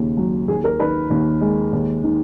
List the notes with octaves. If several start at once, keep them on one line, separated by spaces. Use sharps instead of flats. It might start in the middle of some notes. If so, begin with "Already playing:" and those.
Already playing: D#2 C#3 A#3
F#3
D#2 G#4
A#4
D#3 B4
D#2
G#3
D#2
D#3